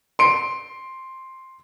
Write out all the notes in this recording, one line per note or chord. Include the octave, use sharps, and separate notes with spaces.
C6 D7